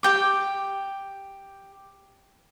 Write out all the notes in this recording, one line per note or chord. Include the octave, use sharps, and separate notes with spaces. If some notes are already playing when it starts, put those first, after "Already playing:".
G4 G5 D6